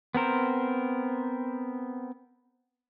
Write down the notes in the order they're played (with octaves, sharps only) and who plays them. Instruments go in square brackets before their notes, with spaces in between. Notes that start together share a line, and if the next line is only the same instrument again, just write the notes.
[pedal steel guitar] B3 C4 A#4 C5